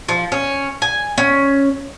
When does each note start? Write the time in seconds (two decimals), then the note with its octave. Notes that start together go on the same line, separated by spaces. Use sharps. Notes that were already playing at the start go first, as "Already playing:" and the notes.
0.09 F3
0.32 C#4
0.82 G#5
1.18 C#4